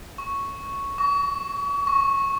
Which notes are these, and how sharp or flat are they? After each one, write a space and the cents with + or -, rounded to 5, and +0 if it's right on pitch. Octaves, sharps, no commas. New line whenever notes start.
C#6 +0
C#6 +35
C#6 -15